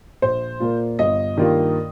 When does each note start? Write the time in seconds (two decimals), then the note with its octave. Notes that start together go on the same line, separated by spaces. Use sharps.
0.22 A#1 C5
0.60 A#2 A#3 F4
0.99 G1 D#5
1.37 G2 D#3 A#3 F4